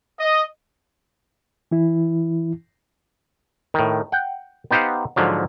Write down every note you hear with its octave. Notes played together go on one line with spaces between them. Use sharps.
D#5
E3 E4
A2 D#3
F#5 G5
B3 D#4 G4 C5 F5 F#5
G#2 D3 F3 F#3